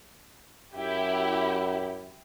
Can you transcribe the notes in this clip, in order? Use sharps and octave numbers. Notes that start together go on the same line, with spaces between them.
F#2 E4 G4